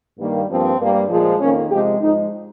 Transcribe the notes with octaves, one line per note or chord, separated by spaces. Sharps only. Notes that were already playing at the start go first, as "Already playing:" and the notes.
G2 D#3 G3 A#3
G2 F3 A#3 C4
G2 G3 A#3
A#2 F3 G#3
F2 D#3 A#3 C#4
C3 F3 G#3 G4
G#2 F3 G#3 D#4